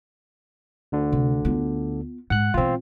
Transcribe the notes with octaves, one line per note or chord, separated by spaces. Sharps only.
D2 D3
C3
B3 F4
G#2 F#5 F#6
B2 E3 C4 F4